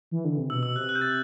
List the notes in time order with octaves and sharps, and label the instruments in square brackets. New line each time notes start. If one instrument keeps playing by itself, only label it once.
[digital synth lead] E3
D3
C3
[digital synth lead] B2 [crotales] E6
[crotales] E6
[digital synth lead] C3 [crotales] F#6
[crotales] F#6
G6
A6